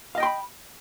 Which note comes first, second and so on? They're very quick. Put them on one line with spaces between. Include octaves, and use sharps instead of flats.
F5 D#5 G5 C6 B5